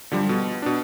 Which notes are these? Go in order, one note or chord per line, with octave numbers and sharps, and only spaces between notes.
D3 F3 G3
B2
B2 D4